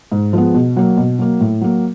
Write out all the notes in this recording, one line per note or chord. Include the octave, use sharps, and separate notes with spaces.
G#2
F3 G#3 B3
B2
F#3 A#3
B2
F#3 A#3
A2
F#3 A#3